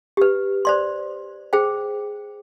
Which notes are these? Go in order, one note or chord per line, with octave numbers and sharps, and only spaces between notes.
G4 B4
C5 D5 C6
G#4 C5 G5